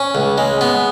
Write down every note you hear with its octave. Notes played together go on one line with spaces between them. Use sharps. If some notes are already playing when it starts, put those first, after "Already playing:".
Already playing: C#4
C#2
G#3
B3